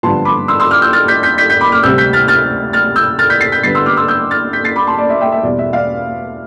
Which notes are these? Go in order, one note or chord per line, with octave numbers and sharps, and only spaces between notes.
G2 D3 F3 B3 A5 C6
B5 D6
C6 E6
C6 E6
D6 F6
E6 G6
F6 A6
G6 B6
G6 B6
G6 B6
G6 B6
B5 D6
D6 F6
D2 C3 G3 C4 E6 G6
G6 B6
F6 A6
F6 A6
F6 A6
E6 G6
F6 A6
G6 B6
A6 C7
G6 B6
G2 D3 G3 B3 A6 C7
C6 E6
D6 F6
C6 E6
E6 G6
F6 A6
G6 B6
A6 C7
B5 D6
A5 C6
D5
E5
E5 G5
E5
E2 B2 G3 D5
E5
D5 F5